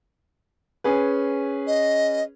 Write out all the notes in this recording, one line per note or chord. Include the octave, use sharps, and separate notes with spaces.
C#4 G#4 B4
D#5